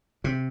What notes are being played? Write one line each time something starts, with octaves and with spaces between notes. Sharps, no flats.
C3